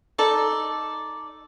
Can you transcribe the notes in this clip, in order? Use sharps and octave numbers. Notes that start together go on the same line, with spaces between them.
D#4 A4 D5